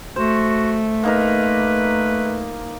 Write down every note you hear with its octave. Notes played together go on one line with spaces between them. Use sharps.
A3 F#4 C5
A#3 D#4 A#4 B4